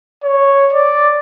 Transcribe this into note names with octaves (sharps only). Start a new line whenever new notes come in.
C#5
D5